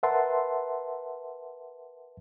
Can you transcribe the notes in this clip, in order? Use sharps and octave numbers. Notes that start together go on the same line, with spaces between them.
A#4 B4 E5 F#5 A5 C6